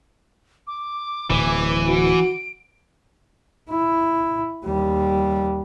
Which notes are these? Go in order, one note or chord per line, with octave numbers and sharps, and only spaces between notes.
D6
D1 B2 E3
F#4 D7
E4
D#2 G3